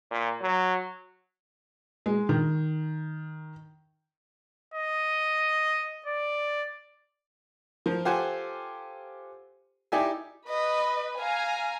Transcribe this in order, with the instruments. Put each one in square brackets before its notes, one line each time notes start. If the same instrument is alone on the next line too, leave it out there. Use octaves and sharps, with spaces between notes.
[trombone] A#2
F#3
[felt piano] G#3
D#3
[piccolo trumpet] D#5
D5
[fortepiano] F3 A#4
F4 G4 A4 C5 F#5 G#5
D#4 E4 G4 D5 E5 G#5
[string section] B4 [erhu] D#5
[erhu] F5 [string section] G#5 A#5